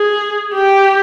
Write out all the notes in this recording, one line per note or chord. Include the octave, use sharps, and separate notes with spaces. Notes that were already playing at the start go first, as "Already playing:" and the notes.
Already playing: G#4
G4